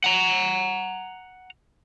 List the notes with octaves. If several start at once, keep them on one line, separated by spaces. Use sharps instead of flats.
F#5 A#5